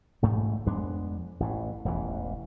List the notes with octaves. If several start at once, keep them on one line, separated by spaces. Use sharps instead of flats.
A1 G#2 A3
F2 G#3 B3 D4
A1 A2 E3
E1 A1 E2 E3